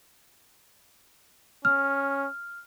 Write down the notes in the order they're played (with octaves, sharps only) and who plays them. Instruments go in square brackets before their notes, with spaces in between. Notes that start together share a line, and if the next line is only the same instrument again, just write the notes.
[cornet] C#4 [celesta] F6